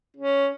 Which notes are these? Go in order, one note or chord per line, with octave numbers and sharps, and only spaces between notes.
C#4